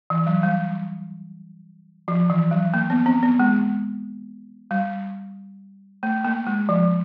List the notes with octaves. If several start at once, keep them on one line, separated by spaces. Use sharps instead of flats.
E3
F#3
G3
F3
E3
F#3
A#3
B3
C4
B3
G#3
G3
A3
A#3
G#3
F3